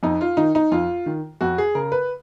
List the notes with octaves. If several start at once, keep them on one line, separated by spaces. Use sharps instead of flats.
F2 D#4
F4
D#3 D#4
D#4
F2 F4
D#3
F2 F#4
G#4
C#3 A#4
B4